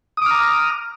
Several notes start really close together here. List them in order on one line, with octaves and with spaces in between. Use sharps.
D#6 D6 F6 A#5